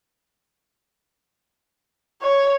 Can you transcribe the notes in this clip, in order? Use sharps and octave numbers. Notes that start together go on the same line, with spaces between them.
C#5